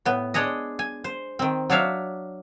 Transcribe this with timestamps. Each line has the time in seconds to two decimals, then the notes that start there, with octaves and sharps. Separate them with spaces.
0.05 A2 B3
0.34 G#3 D4 G#4 C#5 D#5
0.79 G#5
1.04 C5
1.39 D#3 C4
1.70 F#3 D4 C#5 E5 F5